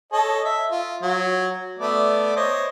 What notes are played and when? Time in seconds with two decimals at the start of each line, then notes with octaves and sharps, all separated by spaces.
0.12 A4 C#5 D#5
0.45 E5
0.71 F4
1.02 F#3
1.79 A3 B3 D5
2.36 C5 C#5 D#5